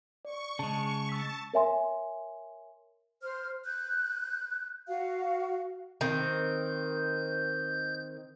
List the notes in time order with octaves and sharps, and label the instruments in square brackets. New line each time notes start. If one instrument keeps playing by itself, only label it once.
[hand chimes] D5 [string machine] C#6
[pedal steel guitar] C#3 G#3 [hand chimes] A5
[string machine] A5 [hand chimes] E6 B6
[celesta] A#4 C#5 E5 G#5 C6
[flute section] C5 F6
F#6 G6
F#4 F5
[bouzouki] D#3 C4 [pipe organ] G6